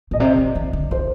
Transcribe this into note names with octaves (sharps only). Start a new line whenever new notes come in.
A#2 D#5
C3 D5
D3
D#3
D3
D#3 C5